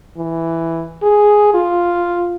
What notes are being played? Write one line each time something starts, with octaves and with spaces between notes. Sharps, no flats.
E3
G#4
F4